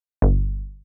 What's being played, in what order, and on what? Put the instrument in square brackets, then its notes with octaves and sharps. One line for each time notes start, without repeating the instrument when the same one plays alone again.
[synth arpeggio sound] G1